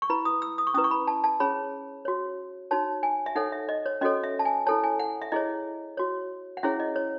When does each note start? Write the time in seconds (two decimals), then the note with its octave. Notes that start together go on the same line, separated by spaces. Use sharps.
0.02 C#6
0.10 E4 B4 B5
0.25 D#6
0.42 E6
0.58 D#6
0.67 C#6
0.74 C#4 E4 B4 D#6
0.84 C#6
0.91 B5
1.07 A5
1.24 A5
1.40 C#4 G#4 C#5 B5
2.05 F#4 C#5
2.71 D#4 F#4 C#5 A5
3.03 G#5
3.26 E5
3.36 D#4 A4 C#5 F#5
3.52 E5
3.69 D#5
3.86 C#5
4.01 C#4 F#4 A4 C#5 D#5
4.24 E5
4.39 A5
4.45 G#5
4.67 E4 A4 C#5 A5
4.83 G#5
5.00 F#5
5.22 E5
5.32 E4 G#4 C#5 D#5
5.97 F#4 C#5
6.57 F#5
6.63 C#4 E4 G#4 C#5 E5
6.80 D#5
6.96 C#5